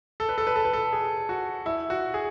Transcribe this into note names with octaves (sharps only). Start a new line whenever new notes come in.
A4
B4
A4
B4
A4
B4
A4
G#4
F#4
E4
F#4
G#4